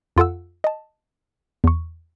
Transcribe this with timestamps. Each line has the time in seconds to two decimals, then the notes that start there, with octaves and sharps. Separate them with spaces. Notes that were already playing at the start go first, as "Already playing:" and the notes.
0.17 F2 F4 A4 F#5 E6
0.64 D#5 A5
1.64 E2 C#6